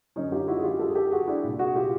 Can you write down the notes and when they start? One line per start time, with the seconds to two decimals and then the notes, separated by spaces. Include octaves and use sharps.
0.16 F#2 D3 C#4 D#4
0.32 F4 G4
0.48 E4 F#4
0.58 G#4
0.63 F4 G4
0.79 G4 A4
0.88 G#4
0.95 G4 A4
1.11 F#4 G#4
1.27 D4 E4
1.44 C2 A#2
1.59 F#4 G#4
1.76 F4 G4